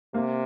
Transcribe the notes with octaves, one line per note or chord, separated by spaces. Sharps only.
C3 A#3